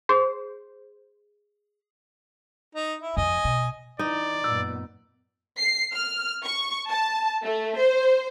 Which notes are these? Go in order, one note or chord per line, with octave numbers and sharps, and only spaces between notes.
G#4 C5
D#4
E4
F2 D#5 G#5
B2
E3 D#4 D5
F#2 A#2 B3 E6
C7
F6
C#6
A5
A3
C5